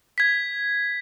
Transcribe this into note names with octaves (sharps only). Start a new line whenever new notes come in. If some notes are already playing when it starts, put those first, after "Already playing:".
G#6 B6